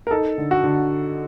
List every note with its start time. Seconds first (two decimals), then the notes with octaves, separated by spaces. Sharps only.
0.07 A#4
0.11 D#4 A4
0.38 D3
0.51 F#4
0.63 D3